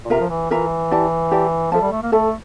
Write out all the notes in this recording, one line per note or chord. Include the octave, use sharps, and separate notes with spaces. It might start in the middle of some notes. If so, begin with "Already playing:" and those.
A#2
C3 F4 A#4 E5 A#5
F3
E3
E3 F4 A#4 E5 A#5
E4 G4 D5 A5
E4 G4 D5 A5
F3 A4 E5 A5
G3
A3
A#3
A3 A4 E5 A5